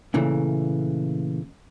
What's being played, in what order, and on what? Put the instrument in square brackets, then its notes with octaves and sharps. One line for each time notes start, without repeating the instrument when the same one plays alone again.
[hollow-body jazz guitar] A#2 C#3 E3 A3